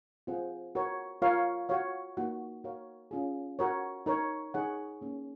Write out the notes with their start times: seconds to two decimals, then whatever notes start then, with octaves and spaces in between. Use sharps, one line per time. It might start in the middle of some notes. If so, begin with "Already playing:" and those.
0.27 C4 F4 G#4 C5 F#5
0.75 F#4 A#4 C#5
1.22 F4 A#4 C#5 F5
1.69 F#4 C#5 F5
2.17 A#3 D#4 F#4
2.64 F#4 A#4 C#5 F5
3.11 C#4 F4 G#4
3.59 F#4 A#4 C#5
4.06 D#4 A#4 C#5
4.54 D#4 G#4 C#5 F#5
5.01 A#3 C#4 G#4